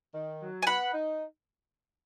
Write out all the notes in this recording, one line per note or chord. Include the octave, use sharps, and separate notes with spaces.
D#3
F#3
G#5
B3 F#5 B5
D#4